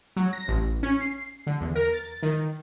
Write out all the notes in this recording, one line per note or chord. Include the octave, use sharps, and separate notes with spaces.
F#3
A#6
A1
C#4
C7
D3
E2
A#4
A6
D#3